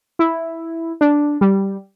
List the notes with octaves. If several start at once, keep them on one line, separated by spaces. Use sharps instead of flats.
E4
D4
G3